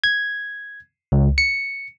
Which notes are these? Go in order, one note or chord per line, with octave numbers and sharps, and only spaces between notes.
G#6
C#2
C#7